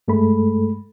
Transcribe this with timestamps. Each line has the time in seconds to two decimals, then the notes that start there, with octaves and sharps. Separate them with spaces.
0.08 G2 G#3 A3 A4 B5